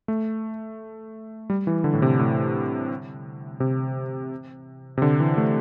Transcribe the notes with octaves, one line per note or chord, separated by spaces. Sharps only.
A3
G3
E3
D3
A2
C3
A2
C3
C3
D3
E3
A3